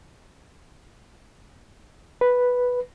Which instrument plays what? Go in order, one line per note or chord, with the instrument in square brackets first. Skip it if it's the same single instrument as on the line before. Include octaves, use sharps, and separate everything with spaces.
[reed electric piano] B4